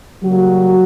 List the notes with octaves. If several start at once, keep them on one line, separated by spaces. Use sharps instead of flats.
C#3 F#3 G3 A#3 F#4